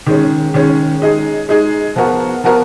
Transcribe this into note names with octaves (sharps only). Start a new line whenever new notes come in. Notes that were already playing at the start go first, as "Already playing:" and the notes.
D#3 G#3 C#4
D#3 G#3 C#4
G#3 D#4 G#4
G#3 D#4 G#4
F3 B3 F#4 A#4
F3 B3 F#4 A#4